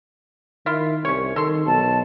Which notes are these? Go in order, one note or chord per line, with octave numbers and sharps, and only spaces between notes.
D#3 E4 F4
C2 C#4 C#5
D#3 A4 C6
B1 A5